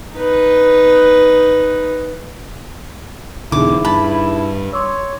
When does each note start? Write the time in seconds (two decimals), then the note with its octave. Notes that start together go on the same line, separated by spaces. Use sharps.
0.16 D#4 B4
3.52 E2 B2 D3 D#4 E4 G#4 D6
3.85 G2 A5 B5
4.73 C#5 C6 D6 E6